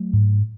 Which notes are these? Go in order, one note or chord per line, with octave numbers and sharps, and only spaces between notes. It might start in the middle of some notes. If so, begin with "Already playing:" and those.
Already playing: F#3 A3
G#2